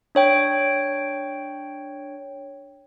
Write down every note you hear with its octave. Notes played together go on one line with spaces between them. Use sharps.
D4 C#5 G5